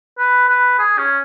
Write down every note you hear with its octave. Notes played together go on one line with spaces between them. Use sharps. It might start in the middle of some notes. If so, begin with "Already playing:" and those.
B4
B4
G#4
C#4